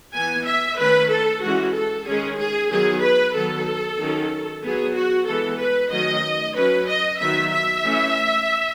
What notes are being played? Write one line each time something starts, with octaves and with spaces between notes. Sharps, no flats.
E3 B3 G#5
E5
D#3 A3 C#4 B4
A4
E3 G#3 C#4 F#4
A4
D#3 G#3 C#4 G#4
G#4
D#3 F#3 B3 G#4
B4
D#3 F#3 B3 A4
D#3 F#3 C#4
F#3 B3 G#4
F#4
E3 G#3 B3 A4
B4
D#3 F#3 A3 C#4 D#5
F#3 C#4 B4
D#5
D#3 F#3 B3 E5
E5
E3 A3 C#4